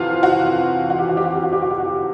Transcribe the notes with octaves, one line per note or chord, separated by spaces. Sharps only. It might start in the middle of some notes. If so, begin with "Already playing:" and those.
Already playing: F2 C3 E3 F4 F#4
F#4
F#4
G4
F#4
G4
F#4
G4
F#4
G4
F#4
G4
F#4